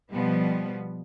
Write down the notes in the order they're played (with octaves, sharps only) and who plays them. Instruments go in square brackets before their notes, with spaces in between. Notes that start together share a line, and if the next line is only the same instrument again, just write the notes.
[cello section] B2 F3 G3 B3